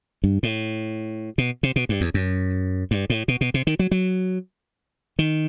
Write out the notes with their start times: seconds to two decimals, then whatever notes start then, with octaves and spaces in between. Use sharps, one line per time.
0.24 G2
0.43 A2
1.38 B2
1.63 C3
1.76 B2
1.89 G2
2.01 E2
2.14 F#2
2.91 G2
3.10 A2
3.28 B2
3.41 B2
3.54 C3
3.67 D#3
3.79 F#3
3.91 F#3
5.19 D#3